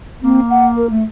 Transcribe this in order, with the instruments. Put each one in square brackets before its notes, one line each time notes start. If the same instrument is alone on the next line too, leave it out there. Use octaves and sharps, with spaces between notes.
[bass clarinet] A#3 [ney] C4
[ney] F#5
A#4
A3